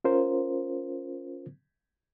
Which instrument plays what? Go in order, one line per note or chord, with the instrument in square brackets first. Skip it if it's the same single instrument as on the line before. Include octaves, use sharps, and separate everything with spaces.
[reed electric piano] C#4 F4 A#4 C5